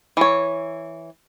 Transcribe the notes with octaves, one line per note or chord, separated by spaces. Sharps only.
E3 C#5